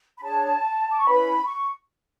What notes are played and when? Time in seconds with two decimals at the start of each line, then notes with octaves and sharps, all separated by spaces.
0.18 B5
0.22 D4 G#4 C#5 A5
0.91 D6
0.98 C#6
1.05 C#4 E4 B4 B5
1.46 C#6